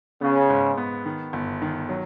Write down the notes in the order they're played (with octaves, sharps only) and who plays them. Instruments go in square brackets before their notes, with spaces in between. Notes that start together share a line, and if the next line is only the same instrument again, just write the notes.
[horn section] C#3 [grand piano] B3
[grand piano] G#2
B3
D#3
G1
D#3
F#3